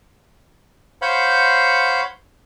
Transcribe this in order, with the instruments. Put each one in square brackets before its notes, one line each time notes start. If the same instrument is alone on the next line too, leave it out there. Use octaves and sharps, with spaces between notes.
[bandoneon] C5 C#5 F5 F#5 B5 G6